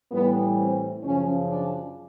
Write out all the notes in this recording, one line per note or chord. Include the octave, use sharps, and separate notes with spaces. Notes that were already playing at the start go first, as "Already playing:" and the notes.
A2 E3 G3 B3
C4
F#2 C#3 F3 C#4
D4